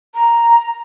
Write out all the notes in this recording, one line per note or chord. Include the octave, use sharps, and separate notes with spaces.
A#5